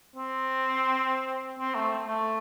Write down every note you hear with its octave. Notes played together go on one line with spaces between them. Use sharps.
C4
C4
A3
A3